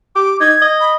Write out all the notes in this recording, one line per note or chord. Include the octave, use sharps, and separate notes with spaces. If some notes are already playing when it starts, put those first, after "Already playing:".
G4 D6
D#4 G#6
D#5
B5